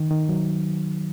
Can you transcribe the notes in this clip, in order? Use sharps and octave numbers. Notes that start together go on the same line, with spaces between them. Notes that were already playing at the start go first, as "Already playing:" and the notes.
Already playing: D#3
D#3
F#3